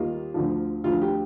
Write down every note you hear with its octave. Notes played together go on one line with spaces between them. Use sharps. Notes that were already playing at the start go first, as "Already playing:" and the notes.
Already playing: D#2 D#3 G3 A#3 F4
D2 D3 F3
D2 D3 F3 F4
G4